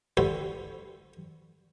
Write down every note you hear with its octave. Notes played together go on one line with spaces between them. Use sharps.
D3 F#4 G4 B4 C5 E5